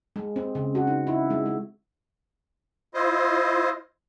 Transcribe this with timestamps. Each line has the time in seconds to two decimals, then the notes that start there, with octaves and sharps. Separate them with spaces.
0.16 G#3
0.36 C4
0.55 C#3
0.75 F#4
0.87 D#4
1.07 E4
1.30 G#3
1.46 G#3
2.94 E4 F4 C5 D#5